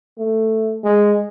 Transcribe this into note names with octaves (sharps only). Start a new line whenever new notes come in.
A3
G#3